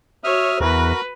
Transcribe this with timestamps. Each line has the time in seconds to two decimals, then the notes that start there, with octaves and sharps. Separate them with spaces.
0.24 F#4 C#5 E5 D#6 F6
0.61 E2 F#4 A#4 B4